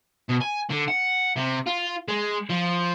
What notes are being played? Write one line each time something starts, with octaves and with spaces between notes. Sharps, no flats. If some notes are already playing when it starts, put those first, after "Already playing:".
B2
G#5
D3
F#5
C3
F4
G#3
F3